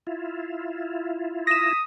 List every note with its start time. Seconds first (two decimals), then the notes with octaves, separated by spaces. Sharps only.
0.07 E4 F4
1.47 D#6 A#6 B6 E7